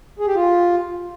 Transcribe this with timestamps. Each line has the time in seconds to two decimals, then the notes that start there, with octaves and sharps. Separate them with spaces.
0.19 G#4
0.27 G4
0.35 F4